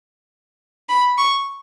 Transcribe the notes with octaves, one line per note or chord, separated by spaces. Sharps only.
B5
C#6